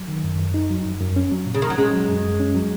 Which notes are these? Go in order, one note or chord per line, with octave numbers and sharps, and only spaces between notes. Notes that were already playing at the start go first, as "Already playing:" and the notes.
Already playing: F#3
D#3
F#2
F#2
D#4
F#3
F#2
F#2
C#4
F#3
A#2
C#3
A#2 D#3
F#3
G#3 C#4
F#3
F#2
F#2
C#4
F#3